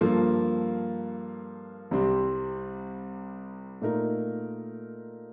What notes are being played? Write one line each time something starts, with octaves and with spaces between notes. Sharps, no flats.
G2 F3 A#3 F4 A4
C2 C3 G3 C4
A#2 A3 D#4 A#4